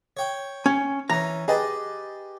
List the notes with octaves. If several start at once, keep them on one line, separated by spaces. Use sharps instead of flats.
C#5 G5
C#4
E3 C#4 A#5
G4 G#4 B4 D#5 A5